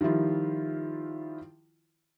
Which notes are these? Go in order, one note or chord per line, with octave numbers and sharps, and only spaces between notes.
D#3 F3 G3 E4 F4